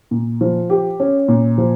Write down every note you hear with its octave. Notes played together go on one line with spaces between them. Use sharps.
A#2
F3
G4
C#4
A#2
F3